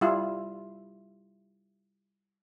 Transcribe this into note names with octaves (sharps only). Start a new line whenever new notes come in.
G3 E4 F4